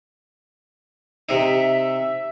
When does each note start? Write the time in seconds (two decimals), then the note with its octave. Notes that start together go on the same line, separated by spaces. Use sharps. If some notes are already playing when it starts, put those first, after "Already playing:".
1.29 C3 D#4 E5